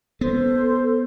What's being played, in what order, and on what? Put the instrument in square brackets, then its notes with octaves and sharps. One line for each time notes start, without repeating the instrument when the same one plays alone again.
[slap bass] B3 [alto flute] A4 [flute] C5